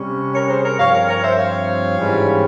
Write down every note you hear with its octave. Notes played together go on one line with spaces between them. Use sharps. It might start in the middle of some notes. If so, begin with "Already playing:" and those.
Already playing: C3 G3 C#4
A#4 C#5
G#4 C5
A#4 C#5
G2 F3 C4 C#5 F5
A#4 C#5
A#4 C#5
C5 E5
C#5 F5
G#2 E3 G3 C#4